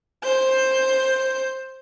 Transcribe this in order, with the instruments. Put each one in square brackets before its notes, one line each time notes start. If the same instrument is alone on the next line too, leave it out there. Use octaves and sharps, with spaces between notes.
[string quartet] C5 G6